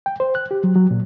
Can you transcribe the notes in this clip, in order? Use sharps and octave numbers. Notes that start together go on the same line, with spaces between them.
G5
C5
F#6
G4
F#3
F#3
A#2